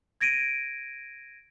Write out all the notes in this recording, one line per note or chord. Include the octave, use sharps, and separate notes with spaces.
G#6 A#6 D7 D#7